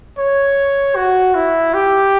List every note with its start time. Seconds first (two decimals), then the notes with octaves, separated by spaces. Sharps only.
0.18 C#5
0.96 F#4
1.35 E4
1.74 G4